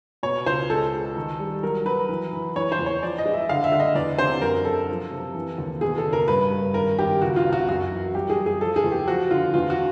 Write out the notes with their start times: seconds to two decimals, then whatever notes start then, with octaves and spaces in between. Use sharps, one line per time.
0.23 B2 C#5
0.46 C#2 C5
0.70 G#3 A4
0.93 G#3
1.16 D#3
1.39 G3
1.63 F#3 A#4
1.85 F#3 B4
2.09 E3
2.33 E3
2.56 E3 C#5
2.72 C5
2.79 E2
2.86 C#5
3.03 F3 D5
3.18 D#5
3.25 G#3
3.34 E5
3.49 D3 F5
3.64 E5
3.72 D3
3.80 D#5
3.95 E2 D5
4.18 C3 C5
4.41 F#2 A#4
4.65 F#3 A4
4.89 F3
5.12 C3
5.35 E3
5.58 D#2
5.81 B2 G#4
5.98 A4
6.06 F#1
6.13 A#4
6.28 G2 B4
6.52 G2
6.74 G#1 A#4
6.99 G#1 G4
7.21 C#2 F#4
7.36 F4
7.45 C3
7.53 F#4
7.69 F#2 F#4
7.91 E3
8.14 G3 G4
8.29 G#4
8.37 F#2
8.46 G#4
8.61 F3 A4
8.76 G#4
8.84 E2
8.92 G4
9.07 F3 F#4
9.30 D3 F4
9.54 E2 F4
9.70 F#4